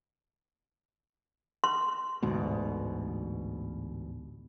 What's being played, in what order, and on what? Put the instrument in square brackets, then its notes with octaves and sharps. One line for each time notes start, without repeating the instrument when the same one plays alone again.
[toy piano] C6
[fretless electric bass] A1 D2 G#2 B2